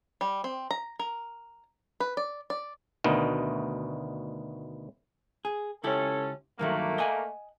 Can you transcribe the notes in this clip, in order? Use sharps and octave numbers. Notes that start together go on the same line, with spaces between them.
G3
C4
A#5
A#4
B4
D5
D5
D2 B2 D#3
G#4
C#2 C#4 E4 G4 A4
G2 D#3 F#3 A3 A#3
D#5 F#5 G#5